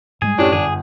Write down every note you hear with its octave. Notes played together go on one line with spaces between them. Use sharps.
G#2 G3 G#3 G#4
F#2 A2 C#4 D4 G4
G1 G#4